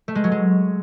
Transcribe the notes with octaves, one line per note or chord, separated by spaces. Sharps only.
A3
G#3
F#3
G#3